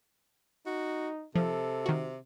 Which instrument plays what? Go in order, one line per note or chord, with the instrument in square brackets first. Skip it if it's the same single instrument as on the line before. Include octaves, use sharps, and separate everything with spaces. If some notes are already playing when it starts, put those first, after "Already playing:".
[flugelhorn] D#4 [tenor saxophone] F#4
[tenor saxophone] C3 [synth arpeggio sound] F3 [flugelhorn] A4
[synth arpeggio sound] D#3 F#4